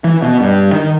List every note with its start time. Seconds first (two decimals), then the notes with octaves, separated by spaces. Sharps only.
0.04 E3
0.22 B2
0.41 G2
0.73 D#3